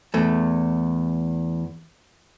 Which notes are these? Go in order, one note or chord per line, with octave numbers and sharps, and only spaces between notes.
E2 A3